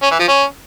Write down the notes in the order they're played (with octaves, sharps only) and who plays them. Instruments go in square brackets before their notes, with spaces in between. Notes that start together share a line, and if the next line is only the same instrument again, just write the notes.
[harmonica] C#4
E3
F3
C#4